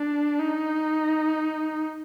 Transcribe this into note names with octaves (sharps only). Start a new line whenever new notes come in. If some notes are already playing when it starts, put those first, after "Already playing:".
Already playing: D4
D#4